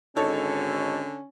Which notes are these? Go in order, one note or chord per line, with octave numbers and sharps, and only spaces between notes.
G#1 D3 C#4 D#4 A4 C#5